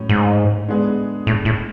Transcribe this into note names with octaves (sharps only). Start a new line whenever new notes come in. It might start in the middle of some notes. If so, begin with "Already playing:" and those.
Already playing: A2 F#3 C#4
G#2
D3 G#3 B3 D4 G#4
A2
A2